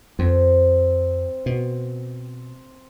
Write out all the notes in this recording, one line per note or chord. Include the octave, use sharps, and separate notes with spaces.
F2 C4
B2